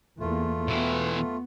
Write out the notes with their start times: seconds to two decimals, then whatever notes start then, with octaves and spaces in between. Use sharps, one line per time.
0.20 E2 A3 A#3 F4
0.68 B2 E3 B3